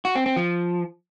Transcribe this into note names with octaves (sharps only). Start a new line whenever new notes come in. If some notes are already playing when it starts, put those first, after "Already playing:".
F#4
C4
C4
F3